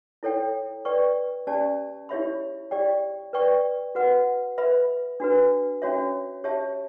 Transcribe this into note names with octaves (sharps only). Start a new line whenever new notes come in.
E4 A4 C#5 G5
B4 D5 G5 C#6
C#4 G4 D5 A5
E4 G4 C#5 E5 B5
G4 D5 G5
B4 D5 G5 C#6
F#4 B4 F#5
B4 E5 B5
D4 F#4 B4
C#4 F#4 C#5 E5
G4 C#5 E5 A5